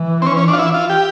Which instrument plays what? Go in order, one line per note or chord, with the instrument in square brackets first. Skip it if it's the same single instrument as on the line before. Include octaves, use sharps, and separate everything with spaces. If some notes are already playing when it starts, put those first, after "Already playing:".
Already playing: [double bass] E3
[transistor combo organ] C4
C#4
C#4
D4
F4
E4
F4
G4